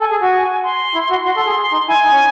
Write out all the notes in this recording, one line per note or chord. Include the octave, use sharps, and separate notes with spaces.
A4 G#5
G#4
F#4
C6
E4
F#4
F#4 C6
A4
G#4
G#4
D#4
E4 G#5
D#4
C#4